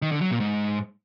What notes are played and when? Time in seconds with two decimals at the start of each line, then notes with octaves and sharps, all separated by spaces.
0.02 D#3
0.12 D3
0.21 F#3
0.30 A#2
0.40 G#2